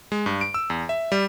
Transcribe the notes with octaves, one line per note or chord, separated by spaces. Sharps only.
G#3
G2
D7
E6
E2
E5
G3